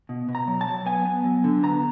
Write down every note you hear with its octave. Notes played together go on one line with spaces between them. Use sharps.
B2
B2
A#5
F#3
A5
F#3
B3 G#5
B3
F#3
D3
B3 A#5